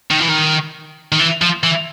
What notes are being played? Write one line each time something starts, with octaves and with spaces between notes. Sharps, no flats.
D#3
E3
D#3
D#3
E3
F3
E3